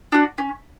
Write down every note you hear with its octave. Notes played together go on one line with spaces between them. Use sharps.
D4 F#4
C#4